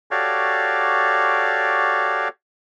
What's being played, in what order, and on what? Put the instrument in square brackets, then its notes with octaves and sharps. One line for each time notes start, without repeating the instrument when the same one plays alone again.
[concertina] F#4 G4 A4 C#5 D5 F5